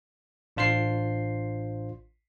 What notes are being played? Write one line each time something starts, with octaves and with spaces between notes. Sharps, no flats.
A1 D4 F4 C5 C6 C7